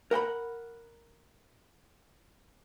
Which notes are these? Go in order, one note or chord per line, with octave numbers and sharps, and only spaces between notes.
A#4 F#5 G5 B5